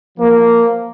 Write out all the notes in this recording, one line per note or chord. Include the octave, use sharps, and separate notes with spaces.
F3 A#3